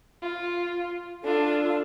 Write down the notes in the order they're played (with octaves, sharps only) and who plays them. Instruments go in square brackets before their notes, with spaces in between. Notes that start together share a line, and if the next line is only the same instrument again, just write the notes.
[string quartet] F4
[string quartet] D4 F4 [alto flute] A4